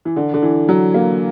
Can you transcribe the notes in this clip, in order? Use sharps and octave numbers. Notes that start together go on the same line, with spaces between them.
E3
D3
D3
E3
F#3
A#3